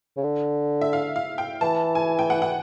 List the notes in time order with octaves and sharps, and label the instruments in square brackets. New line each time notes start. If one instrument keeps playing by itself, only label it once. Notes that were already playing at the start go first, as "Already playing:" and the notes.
[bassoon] C#3
D3
[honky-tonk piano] E5
F5
F5
G5
[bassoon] E3 [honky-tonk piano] A5
[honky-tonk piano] G#5
G5
F#5
F#5